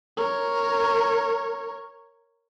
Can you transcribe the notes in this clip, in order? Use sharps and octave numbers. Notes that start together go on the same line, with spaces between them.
A#4 C#5